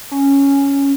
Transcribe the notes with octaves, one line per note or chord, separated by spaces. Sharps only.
C#4